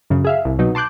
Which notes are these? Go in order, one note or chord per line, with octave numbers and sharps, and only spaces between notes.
F#2 C#3
G#4 E5 F5
C2
B2 F#3 D#4
A5 C6 D6 F#6 G6